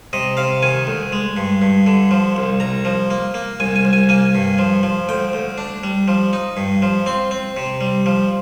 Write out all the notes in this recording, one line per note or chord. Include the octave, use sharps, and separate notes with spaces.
C3 D#5
C3 F5
D#3 G#5
D2
G#3
G2
G2
D3
F3
C2
C2 A#5
F3
A#3
A#3
C2 G#5
G#5
C2
G#5
A#3 G#5
G2
F3
F3
D2 G5
D2
D4
G3
F3
D#4
G2
F3
C4 C6
C4
C3
G3
F3